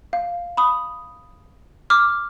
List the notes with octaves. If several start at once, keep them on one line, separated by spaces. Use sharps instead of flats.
F5
B5 D#6
D6 F6